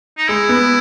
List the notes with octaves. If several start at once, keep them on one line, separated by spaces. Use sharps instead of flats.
D#4
G#3 E4
B3